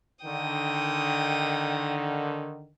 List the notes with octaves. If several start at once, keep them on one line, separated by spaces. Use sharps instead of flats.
D3 D#3 G5 D#6